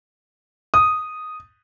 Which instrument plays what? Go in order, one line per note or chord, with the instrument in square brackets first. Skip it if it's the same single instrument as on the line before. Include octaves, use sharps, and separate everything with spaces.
[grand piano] D#6